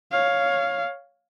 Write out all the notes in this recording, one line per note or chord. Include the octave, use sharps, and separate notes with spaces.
C#5 F5